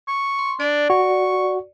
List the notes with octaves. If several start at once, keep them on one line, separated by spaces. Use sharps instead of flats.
C#6
C6
D4 D5
F#4 C#6